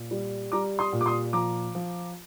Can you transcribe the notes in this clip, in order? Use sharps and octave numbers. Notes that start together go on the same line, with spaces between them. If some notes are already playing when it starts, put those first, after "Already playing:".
Already playing: A#2
G3
G3 A#5 D6
C6 D#6
A#2
D6
C6 D#6
F3 A#5 D6
F3